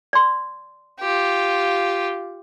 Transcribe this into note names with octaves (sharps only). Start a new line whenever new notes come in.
D5 C6
F4 G4